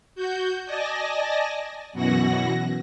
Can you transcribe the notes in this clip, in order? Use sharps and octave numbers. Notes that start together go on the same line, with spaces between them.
F#4 G6
D5 D#5 G#5 A5 A#6
F#2 B2 E3 F#4 F#5 A#6